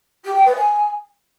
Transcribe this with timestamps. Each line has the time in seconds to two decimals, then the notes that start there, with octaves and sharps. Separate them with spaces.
0.24 G4
0.35 G5
0.45 B4
0.56 G#5